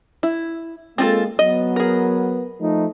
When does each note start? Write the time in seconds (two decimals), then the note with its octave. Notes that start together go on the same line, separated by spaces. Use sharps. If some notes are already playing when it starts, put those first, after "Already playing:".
0.23 E4
0.98 G#3 A#3 C4 F4 A4
1.39 F#3 B3 D#5
1.76 G#4 A#4
2.61 F3 A3 D#4